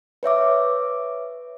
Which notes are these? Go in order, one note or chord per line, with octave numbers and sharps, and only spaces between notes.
B4 C#5 E5 D6